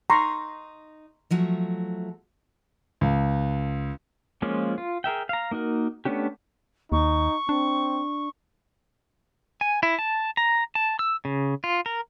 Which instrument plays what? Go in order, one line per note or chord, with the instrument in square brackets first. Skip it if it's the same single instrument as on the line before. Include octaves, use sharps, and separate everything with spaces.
[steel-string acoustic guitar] D#4 [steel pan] A#5 C6 C#6
[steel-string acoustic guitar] F3 F#3 A3
[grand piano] C#2
[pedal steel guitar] F3 G#3 A#3 C#4 F4
F4
G#4 A#4 E5 G5
F5 A#5
A#3 D#4 F#4 A#4
A3 B3 C#4 D4 G4
[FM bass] D#2 [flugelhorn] D#4 [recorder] C#6
[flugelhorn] C4 [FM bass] D4
[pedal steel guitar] G#5
E4
A5
A#5
A5
E6
C#3
F4
A#4